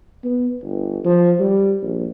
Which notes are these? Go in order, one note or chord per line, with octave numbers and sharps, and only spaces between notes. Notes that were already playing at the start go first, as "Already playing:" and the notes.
B3
G1
F3
G3
A#1